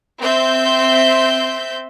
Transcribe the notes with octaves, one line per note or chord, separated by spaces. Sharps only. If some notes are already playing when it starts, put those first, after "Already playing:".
C4 E5 G6